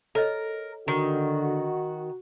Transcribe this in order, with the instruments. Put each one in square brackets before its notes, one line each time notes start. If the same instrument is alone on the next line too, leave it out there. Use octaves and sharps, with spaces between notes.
[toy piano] A4 C#5 D#5 [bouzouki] A#4
[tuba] D3 [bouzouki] D#3 [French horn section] F#4